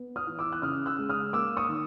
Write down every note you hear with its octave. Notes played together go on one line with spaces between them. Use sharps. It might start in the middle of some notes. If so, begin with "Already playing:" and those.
Already playing: B3
D#6 F6
E3
D6 E6
F#6
C#3 D#6 F6
E6 F#6
G#3
D#6 F6
A#3 D6 E6
C#6 D#6
D#3